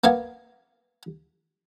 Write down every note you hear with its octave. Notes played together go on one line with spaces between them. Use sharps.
A#3 B3 F5 G#5